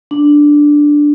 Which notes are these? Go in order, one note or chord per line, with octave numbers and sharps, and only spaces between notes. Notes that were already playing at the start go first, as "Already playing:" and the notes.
D4